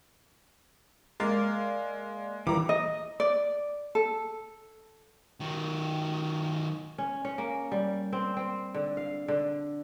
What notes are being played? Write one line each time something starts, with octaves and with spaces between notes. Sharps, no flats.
G#3 A#3 D5 F5
D#2 A#2 E3 G3 A#5 D6
D#5
D5
A4
D#3 F#3
C#4
C#4
A#3
G3
C4
C4
D3
F5
D3